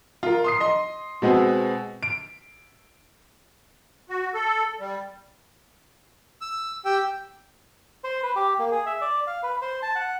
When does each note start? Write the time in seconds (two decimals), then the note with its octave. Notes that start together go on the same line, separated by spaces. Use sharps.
0.23 F4 A#4
0.44 C6 D#6 C7
0.60 D#5 C6
1.22 B2 G#3 B3 C4
2.03 D7
4.09 F#4
4.34 A4
4.80 G3
6.41 E6
6.85 G4 G5 E6
8.04 C5
8.23 B4
8.36 G4
8.59 A#3
8.72 G#4
8.86 E5
9.01 D5
9.27 F5
9.43 B4
9.62 C5
9.83 A5
9.95 F#5